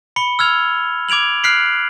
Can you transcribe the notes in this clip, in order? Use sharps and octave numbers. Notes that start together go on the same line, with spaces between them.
B5 C#7 G7
E6 F6 G#6 F7
D6 G#6 D7 F7 F#7
F6 F#6 B6 C7 D7 F#7